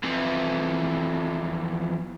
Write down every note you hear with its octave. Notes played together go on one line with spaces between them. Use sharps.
F2 E3